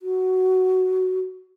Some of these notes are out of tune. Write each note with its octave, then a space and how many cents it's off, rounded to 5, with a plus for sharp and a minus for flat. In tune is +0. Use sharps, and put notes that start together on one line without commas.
F#4 +10